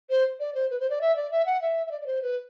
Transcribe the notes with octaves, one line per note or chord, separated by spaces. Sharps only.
C5
D5
C5
B4
C5
D5
E5
D5
E5
F#5
E5
E5
D5
D5
C5
B4